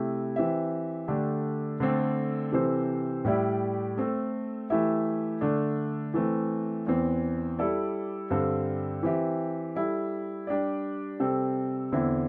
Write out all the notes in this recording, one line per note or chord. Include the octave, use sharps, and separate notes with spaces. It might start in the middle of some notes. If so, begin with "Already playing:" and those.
Already playing: C3 A3 E4
E3 C4 G4 E5
D3 A3 D4 G4
D3 A3 C4
C3 E3 C4 A4 C5
A2 G3 E4 G4 D5
A3 C4 A4
E3 A3 E4 G4 E5
D3 A3 D4
E3 A3 C4
E2 E3 C4
G3 E4 A4 D5
G2 D3 G3 C4 A4
E3 C4 G4 E5
G3 E4 A4
G3 D4 G4 D5
C3 G3 C4 A4
E2 D3 C4 E4